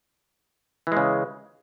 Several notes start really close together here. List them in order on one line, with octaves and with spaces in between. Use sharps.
E3 G#3 C#3